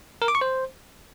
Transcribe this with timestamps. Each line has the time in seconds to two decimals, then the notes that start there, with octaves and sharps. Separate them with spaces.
0.22 A#4
0.28 D6
0.35 C#6
0.41 C5